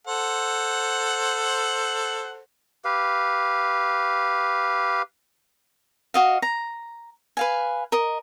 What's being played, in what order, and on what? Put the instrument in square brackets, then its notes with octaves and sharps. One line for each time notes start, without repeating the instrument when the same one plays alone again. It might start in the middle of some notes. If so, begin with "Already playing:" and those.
[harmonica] A4 C5 F#5
[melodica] G4 B4 F5
[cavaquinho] F#4 D#5 F5
A#5
B4 F5 G#5
A#4 D#5